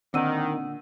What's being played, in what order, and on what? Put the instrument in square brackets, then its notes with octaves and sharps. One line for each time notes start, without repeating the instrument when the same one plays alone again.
[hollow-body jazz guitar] A#2 D3 [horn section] D#3 [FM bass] C4 [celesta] F#5 E6 D#7